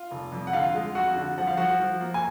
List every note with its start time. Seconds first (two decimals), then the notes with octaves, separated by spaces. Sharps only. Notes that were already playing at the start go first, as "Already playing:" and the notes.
Already playing: F4
0.11 F1
0.32 F2
0.47 F#5
0.53 D3 F4 F5
0.74 G#3
0.95 F2 F#4 F#5
1.16 D3
1.38 F3 F#5
1.47 F5
1.57 F3 F#4 F#5
1.80 F3
2.01 A#3
2.14 G#5